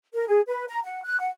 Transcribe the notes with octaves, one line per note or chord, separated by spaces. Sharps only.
A#4
G#4
B4
A#5
F#5
F#6
F#5